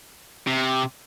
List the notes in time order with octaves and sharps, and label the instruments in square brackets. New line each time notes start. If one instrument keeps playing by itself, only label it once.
[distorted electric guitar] C3